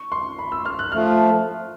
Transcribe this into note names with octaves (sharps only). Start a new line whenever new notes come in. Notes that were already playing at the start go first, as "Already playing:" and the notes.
Already playing: C#6
C6
B5
E6
F6
F#6
F3 A3 F6